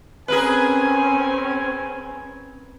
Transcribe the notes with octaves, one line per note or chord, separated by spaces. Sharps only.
C4 C#4 G#4 A#4 B4 G#5